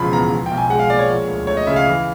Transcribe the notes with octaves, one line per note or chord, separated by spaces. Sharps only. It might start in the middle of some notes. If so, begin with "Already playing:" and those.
Already playing: E1 C#3 F3 B5
E2 A#5
F3
B1 G5
G#5
G#3 F#5
F5
A#2 D5
C#5
F3
D2
A3 C#5
D#5
C#3 E5
F5
E3